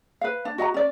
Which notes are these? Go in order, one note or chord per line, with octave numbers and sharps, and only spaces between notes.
B4 F5
D4
F#4 D#5 G5 A#5
C#4 D5